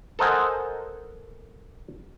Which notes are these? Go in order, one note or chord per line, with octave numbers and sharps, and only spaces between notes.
A4 A#4 C5 D#5 F#5 G#5